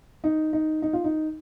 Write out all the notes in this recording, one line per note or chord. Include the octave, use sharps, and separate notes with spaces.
D#4
D#4
D#4
F4
D#4